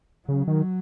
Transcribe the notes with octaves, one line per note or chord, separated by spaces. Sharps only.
C#3 F#3
D#3